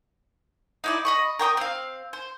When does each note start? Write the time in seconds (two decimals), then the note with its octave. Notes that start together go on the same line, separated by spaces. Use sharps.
0.84 D#4 E4 D5
1.05 D#5 B5 C#6
1.39 A#4 G5 D6 D#6
1.57 C4 F5
2.13 C5